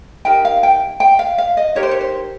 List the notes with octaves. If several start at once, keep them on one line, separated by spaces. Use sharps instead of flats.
D#4 G4 A#4 G5
F5
G5
G5
F5
F5
D#5
D#4 G4 A#4 C#5
C5
C#5
C5